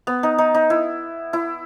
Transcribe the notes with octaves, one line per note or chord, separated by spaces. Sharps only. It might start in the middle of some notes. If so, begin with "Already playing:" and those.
B3
D#4
D#4
D#4
E4
E4